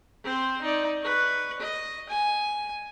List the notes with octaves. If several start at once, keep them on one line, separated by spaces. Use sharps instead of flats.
C4 C5
D#4 D5
B4 C#6
D#5
G#5